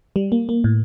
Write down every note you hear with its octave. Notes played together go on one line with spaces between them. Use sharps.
G3
A#3
A#3
A2